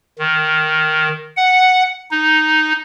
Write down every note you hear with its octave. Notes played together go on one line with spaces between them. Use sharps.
D#3
F#5
D#4